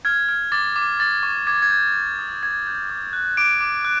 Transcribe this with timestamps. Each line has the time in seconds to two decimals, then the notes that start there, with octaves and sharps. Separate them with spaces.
0.05 F6 G#6
0.29 F6
0.52 D6 A6
0.76 D6
0.99 C#6 A6
1.23 C#6
1.47 D6 G#6
1.62 G#6
1.70 D6 G6
1.95 G6
2.19 D#6
2.43 G6 G#6
2.67 G6
2.90 D6
3.13 F#6
3.37 D6 D7
3.61 D6
3.85 F#6